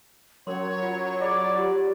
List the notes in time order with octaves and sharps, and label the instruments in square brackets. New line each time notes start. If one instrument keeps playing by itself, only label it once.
[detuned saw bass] F#3 [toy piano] C#4 A#4 C6 [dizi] C#5
[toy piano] F4
[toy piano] F4 G#4 [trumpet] D5
[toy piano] F4 G4